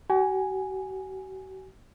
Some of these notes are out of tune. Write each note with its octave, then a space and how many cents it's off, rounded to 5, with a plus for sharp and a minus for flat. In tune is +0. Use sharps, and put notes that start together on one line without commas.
F#4 +45 G#5 +0